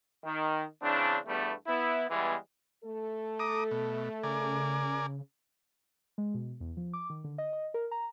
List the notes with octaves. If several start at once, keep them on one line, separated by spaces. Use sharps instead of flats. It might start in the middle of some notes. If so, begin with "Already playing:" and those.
D#3
C#3 E3 C4 D4
E2 G2 G3 A3 B3
B3 E4
E3 G3 G#3 B3
A3 A4
A#5 D6 D#6
B2
C#3 A#4 D5 G#5
G#3
B2
E2
F3
D6
D#3
D3
D#5
D#5
A#4
A#5